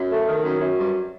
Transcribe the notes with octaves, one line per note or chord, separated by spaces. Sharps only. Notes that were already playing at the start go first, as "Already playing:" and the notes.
Already playing: F#2
A3
D#3
F#2
F#2
G2